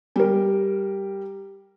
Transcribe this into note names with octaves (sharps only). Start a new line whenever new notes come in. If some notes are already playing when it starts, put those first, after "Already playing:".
G3 A#4